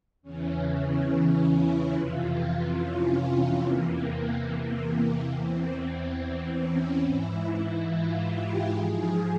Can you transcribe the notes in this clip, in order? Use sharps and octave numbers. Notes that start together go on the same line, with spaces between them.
E2 C#3 E3 C#4
C#4
E4
F2 C3 E3 F4
C#4
E2 C3 E3 A#3
A#3
E2 E3 C4
C4
C#4
G#2 E3 E4
F4
G4
G#2 F3 G#4